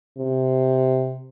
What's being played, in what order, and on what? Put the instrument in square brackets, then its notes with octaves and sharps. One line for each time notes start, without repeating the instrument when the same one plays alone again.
[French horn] C3